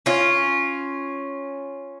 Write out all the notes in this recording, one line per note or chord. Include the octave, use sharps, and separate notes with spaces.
C#4 F4